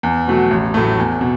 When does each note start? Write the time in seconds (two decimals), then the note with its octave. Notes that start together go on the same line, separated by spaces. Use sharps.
0.03 E2
0.27 B2 F#3 A3 F#4
0.51 A1
0.74 A2 F#3 A3
0.98 E2
1.21 B2